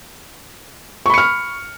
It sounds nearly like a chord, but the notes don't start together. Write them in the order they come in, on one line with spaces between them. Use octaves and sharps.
C#6 B5 C#7 F6